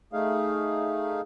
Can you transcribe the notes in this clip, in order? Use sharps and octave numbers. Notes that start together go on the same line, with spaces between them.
A3 D#4 G#4 F5